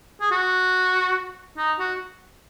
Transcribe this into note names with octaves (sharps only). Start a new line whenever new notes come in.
G#4
F#4
D#4
F#4